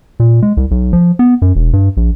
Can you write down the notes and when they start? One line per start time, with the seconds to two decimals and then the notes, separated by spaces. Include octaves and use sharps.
0.20 A#2
0.42 G#3
0.57 C2
0.71 B1
0.93 F3
1.19 B3
1.42 F#2
1.56 E1
1.73 G2
1.97 A#1